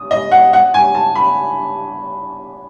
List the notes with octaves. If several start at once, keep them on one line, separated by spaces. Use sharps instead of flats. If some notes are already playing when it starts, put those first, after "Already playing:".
Already playing: D#6
D#5
F#5
F#5
G#5
A5
B5